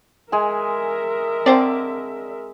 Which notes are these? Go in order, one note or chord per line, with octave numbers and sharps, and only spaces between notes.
G#3 A#4 E5 G#5
D3 C4 C5 D5 G5